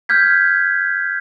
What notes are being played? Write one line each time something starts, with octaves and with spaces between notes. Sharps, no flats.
F6 G6 G#6 B6